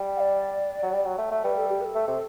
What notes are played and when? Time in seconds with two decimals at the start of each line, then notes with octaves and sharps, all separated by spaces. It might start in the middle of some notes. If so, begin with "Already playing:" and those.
Already playing: G3
0.16 F#5
0.20 D5
0.83 F#3
0.93 G3
1.05 F#3
1.18 A3
1.31 A3
1.44 G3 B4
1.57 A4
1.69 G4
1.81 B4
1.85 A4
1.95 A3
2.08 C3